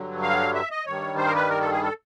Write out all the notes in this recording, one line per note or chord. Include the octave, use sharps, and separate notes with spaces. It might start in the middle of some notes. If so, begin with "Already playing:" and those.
Already playing: G2 D3 F#3
F5
E5
D#5
G2 D#3 G3 C#5
C5
A#4
B4
A#4
A4
G#4
A4